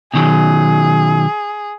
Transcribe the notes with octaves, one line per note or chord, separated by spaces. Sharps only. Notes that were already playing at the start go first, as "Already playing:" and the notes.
B2 D#3 F#3 G#4